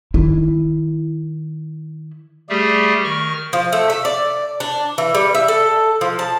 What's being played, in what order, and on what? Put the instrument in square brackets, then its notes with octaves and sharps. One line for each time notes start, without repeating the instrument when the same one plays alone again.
[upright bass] D#3 E4
[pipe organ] G3 A3 G4 G#4
D#3 C#6 F6
[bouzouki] F3
A3
E5
D5
D4
E3
G3
E5
A4
F3
A5